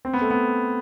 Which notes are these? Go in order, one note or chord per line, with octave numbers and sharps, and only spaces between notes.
C4
B3
A3
B3